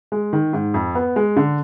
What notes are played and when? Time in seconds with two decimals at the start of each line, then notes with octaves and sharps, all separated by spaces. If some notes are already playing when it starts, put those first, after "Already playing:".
0.12 G#3
0.33 D#3
0.53 G#2
0.74 F2
0.95 B3
1.16 G#3
1.37 D3